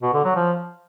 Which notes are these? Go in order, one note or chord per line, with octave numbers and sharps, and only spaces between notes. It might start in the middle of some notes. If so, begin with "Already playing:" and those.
B2
D3
F#3
F3